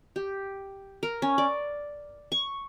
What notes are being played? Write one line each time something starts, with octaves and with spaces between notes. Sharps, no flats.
G4
A#4
C#4
D5
C#6